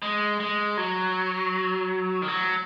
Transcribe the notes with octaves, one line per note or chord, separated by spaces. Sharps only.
G#3
G#3
F#3
D#3
F#3